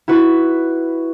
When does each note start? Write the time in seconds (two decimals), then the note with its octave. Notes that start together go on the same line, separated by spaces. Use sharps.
0.08 E4 F#4 B4